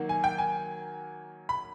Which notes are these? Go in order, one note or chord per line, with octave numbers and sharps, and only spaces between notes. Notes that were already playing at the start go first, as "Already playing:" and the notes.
Already playing: D#3 F#3 A#3
G#5
G5
G#5
B5